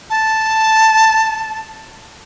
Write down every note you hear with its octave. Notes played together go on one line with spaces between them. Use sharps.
A5